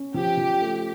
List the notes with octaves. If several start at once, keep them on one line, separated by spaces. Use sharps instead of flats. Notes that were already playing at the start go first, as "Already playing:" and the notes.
Already playing: C#4
F3 G4
F3
A3